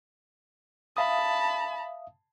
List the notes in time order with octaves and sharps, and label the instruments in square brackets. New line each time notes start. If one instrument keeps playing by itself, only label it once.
[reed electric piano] E5 F5 D#6 [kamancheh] A5 B5